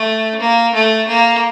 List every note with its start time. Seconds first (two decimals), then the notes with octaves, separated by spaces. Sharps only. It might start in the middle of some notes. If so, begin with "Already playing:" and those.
Already playing: A3
0.40 A#3
0.74 A3
1.08 A#3